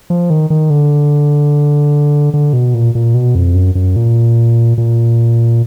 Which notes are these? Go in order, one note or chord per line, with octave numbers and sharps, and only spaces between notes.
F3
D#3
D#3
D3
D3
B2
A#2
A#2
B2
F2
F#2
F#2
A#2
A#2